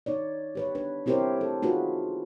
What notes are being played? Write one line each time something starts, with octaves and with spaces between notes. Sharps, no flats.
D#4 C#5 D5
G4 B4 C#5
D4 B4
C4 E4 G4 A#4 C5 C#5
A4
D#4 F4 F#4 G#4 B4